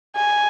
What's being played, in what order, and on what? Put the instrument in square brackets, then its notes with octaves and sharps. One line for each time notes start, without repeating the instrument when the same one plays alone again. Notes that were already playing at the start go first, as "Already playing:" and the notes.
[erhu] G#5